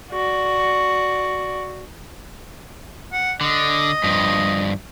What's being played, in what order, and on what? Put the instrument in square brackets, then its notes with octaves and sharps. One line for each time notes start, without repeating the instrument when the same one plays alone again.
[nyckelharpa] F#4 D5
[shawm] F#5
[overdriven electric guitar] D3 [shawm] D#5
[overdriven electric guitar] G2 F3